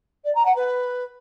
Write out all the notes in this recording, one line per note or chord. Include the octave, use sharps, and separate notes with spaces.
D5
A#5
F#5
B4